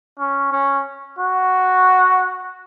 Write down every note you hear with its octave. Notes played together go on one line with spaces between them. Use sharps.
C#4
C#4
F#4